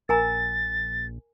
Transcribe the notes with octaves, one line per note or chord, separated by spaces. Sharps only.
A#1 A#4 G#5 A#5 A6